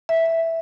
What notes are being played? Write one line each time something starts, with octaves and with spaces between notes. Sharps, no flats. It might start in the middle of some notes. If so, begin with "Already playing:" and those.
E5